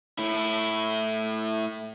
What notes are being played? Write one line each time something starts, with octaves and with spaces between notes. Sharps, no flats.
A2 E4